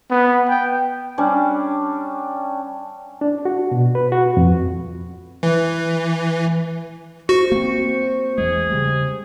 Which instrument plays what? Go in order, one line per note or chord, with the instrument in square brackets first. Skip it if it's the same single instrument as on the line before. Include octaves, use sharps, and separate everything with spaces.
[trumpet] B3
G5
[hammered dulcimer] G3 C#4 D4
[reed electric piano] D4
F#4
B2
B4
F#4
F2
[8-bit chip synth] E3
[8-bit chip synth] F#4 [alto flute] C5 [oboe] C#6
[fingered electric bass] A#3 C4
[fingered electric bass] E2 G#3 [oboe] G#4
[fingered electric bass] C#3 G3 G#3